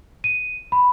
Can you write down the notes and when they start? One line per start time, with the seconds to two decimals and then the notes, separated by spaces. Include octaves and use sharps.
0.24 D#7
0.72 B5